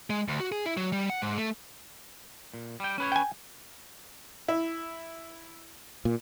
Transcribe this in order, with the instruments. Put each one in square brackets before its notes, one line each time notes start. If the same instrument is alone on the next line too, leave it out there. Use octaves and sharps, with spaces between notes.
[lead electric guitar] G#3
D2
F#4
G#4
E4
F#3
G3
F#5
G#2
A3
[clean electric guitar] A#2
G3 G5
C#4 B4 C#5
[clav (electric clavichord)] G5 G#5
[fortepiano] E4
[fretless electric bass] A#2